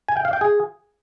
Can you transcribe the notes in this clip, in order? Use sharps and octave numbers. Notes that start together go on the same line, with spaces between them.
G#5
G5
F5
G5
G#4